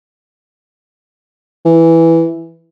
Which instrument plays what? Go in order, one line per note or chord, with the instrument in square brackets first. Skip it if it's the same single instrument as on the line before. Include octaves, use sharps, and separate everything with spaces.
[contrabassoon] E3